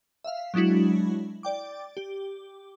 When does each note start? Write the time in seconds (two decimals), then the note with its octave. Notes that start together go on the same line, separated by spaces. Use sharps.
0.24 E5 F5
0.54 F#3 G#3 D4 E4 F#4
1.43 D5 G5 D6
1.97 G4